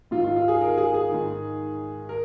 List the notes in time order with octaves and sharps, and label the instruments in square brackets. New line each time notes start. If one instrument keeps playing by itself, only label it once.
[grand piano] G#2 D#3 F4
F4
F4
G#4
A#4
G#4
G#4
G#2 D#3
A#4